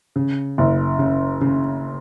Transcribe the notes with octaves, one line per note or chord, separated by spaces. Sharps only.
C#3
F#1
C#3
C#3